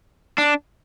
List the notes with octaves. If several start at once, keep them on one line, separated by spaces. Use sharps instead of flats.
D4